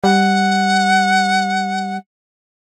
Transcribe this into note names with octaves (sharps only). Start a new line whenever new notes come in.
G3 F#5